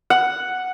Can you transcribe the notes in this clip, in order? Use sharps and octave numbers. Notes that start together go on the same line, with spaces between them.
F#5